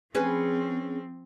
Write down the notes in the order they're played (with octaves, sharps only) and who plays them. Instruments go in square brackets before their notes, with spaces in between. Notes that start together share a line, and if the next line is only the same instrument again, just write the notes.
[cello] F3 C4 [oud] C#4 G#4 B4